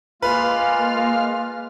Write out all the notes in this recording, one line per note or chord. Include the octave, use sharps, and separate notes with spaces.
G#3 A#3 F4 B4 F6